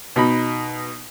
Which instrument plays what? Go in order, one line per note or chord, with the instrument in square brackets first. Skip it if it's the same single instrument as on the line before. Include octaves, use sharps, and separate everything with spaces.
[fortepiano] B2 D#4 B5